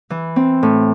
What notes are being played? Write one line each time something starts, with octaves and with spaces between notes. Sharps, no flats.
E3
C4
A2